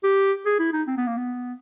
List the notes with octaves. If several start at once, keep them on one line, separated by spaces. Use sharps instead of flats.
G4
G#4
E4
D#4
C4
B3
A#3
B3